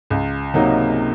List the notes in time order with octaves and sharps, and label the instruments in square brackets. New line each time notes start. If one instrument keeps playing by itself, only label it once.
[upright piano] C#2
C3 F#3 A#3 D#4